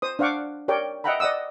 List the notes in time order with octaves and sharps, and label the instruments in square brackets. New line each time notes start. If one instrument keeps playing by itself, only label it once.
[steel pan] C5 D#6
D4 C5 F5 F#5 C#6 D6
G4 A#4 C#5 D5 G5
D#5 E5 F#5 G5 A#5 B5
D5 D#5 F#5 D#6 E6